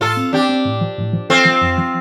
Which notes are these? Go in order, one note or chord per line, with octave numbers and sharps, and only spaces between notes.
A2 F4 A4
C4
C4 D4 G4
C4
A2
F3
A2
F3
C4 F4 A4
F3
F2
F3